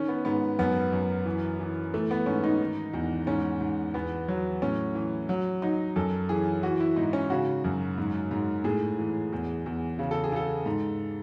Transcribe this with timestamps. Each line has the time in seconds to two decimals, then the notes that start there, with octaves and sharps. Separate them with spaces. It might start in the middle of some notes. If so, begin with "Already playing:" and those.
Already playing: D#3 C#4
0.08 B3
0.25 G#2 B3
0.59 F#2 B3
0.93 F#2
1.26 E3
1.59 E3
1.94 E3 A3
2.11 B3
2.26 G#2 C#4
2.44 D#4
2.61 D#3
2.93 E2
3.27 G#2 C#4
3.61 G#2
3.94 E2 B3
4.28 F#3
4.62 A2 C#4
4.95 E3
5.29 F#3
5.62 F#3 D#4
5.96 F#2 A4
6.29 E3 G#4
6.63 E3 F#4
6.80 E4
6.96 G#2 D#4
7.13 C#4
7.30 C#3 F#4
7.64 F#2
7.98 G#2
8.31 G#2
8.64 A2 G#4
8.99 E3
9.33 E2
9.66 E2
9.99 C#3
10.11 A4
10.24 G#4
10.32 C#3 A4
10.66 G#2